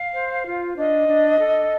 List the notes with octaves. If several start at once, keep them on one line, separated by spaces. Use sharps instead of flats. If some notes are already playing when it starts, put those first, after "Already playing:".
Already playing: F5
C5
F4
D4 D#5
D4
A4